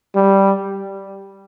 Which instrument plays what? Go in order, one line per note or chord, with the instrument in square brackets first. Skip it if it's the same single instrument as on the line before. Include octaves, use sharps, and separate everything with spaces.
[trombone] G3